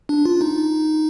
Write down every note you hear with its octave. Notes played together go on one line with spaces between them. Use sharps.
D4
F4
D#4